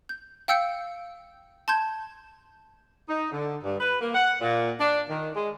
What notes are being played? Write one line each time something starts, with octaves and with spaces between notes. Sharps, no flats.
G6
F5 G5 E6 G6 C#7
A5 C6 G6 G#6
D#4
D3
G2
B4
A#3
F#5
A#2
D4
D#3
G#3